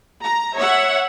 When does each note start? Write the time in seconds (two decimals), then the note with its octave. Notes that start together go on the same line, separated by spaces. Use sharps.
0.21 A#5
0.55 C#5 E5 F#5